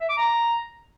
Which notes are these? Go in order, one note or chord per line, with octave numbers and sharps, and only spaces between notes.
E5
D6
A#5